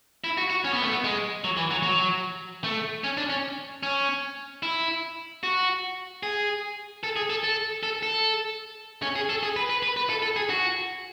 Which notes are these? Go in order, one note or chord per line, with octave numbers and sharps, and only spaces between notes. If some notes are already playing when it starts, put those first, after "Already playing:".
E4
F#4
F#4
C#4
B3
A3
B3
G#3
F#3
E3
F#3
F#3
A3
C#4
D4
C#4
C#4
E4
F#4
G#4
A4
G#4
A4
A4
A4
A4
C#4
G#4
A4
G#4
B4
B4
B4
B4
A4
A4
G#4
F#4